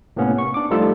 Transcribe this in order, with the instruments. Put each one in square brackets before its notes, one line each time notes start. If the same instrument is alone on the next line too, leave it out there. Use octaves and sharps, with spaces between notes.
[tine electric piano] A2 C3 A#3 B3 C#4
C#6
D4 D6
F3 G3 A3 D#4 F4 A4